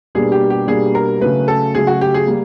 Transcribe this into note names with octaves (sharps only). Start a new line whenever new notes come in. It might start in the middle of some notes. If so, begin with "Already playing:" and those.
B2 G3 A#3 D4 F#4 G#4
G4
G4
B2 G3 A#3 D4 F#4 G#4
A#4
C#3 F#3 A3 B4
A4
C#3 F#3 A3 G#4
F#4
G4
G#4
G3 A#3